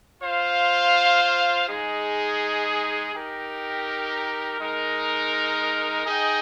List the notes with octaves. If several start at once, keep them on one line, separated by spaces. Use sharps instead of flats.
F4 C5 F5
G#3 D#4 G#4
D#4 G4 A#4
G#3 D#4 A#4
D#4 G#4 D#5 G5